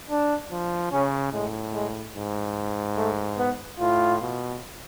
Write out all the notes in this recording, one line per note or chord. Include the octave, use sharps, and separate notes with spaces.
D4
F3
C#3 C#4
A2 G#3
G#3
G#2
A3
B3
A2 F4
B2